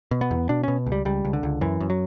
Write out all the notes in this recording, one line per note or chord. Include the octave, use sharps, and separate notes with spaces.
B2
B3
E2
B2 D4
B2 C#4
C#2
G3
C#2 G3
C#2
D3
C#2
F#2 E3
F#2
F#3